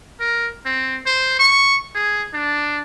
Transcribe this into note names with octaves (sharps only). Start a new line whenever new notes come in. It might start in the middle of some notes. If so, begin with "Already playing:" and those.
A#4
C4
C5
C#6
G#4
D4